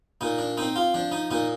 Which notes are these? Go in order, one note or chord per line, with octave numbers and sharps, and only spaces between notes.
A#2 D#4
D4
C4 D#4
F4
F3 D4
D#4
A#2 D#4